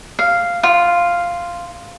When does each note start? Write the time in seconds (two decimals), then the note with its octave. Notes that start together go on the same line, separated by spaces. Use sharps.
0.19 F5
0.63 F4